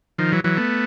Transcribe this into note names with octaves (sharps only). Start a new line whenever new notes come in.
D#3 F3
E3 F#3
E3 F#3
A3 B3